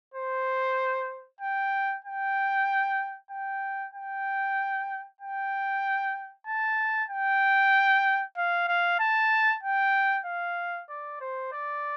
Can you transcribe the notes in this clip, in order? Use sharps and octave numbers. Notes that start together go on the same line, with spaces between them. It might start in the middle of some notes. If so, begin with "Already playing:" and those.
C5
G5
G5
G5
G5
G5
A5
G5
F5
F5
A5
G5
F5
D5
C5
D5